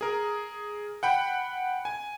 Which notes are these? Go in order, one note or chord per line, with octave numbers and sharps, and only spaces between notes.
G#4 A#4
F#5 G5 B5
G#5